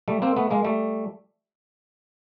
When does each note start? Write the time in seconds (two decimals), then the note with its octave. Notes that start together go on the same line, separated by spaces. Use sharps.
0.08 G3 A3
0.22 A#3 C4
0.36 A3 B3
0.50 G#3 A#3
0.64 G3 A3